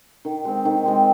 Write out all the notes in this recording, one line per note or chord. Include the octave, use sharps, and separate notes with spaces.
D#3
G#3 C4
D#3
G#3 C4